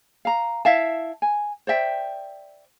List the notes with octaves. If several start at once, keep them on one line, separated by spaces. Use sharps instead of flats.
F5 A#5
E4 E5 F5 A5
G#5
C5 D5 E5 G5